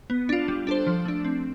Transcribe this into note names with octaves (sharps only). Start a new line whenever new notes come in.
B3
D4 F4
G3
D4 A4 C5
F3
A3 D4
C4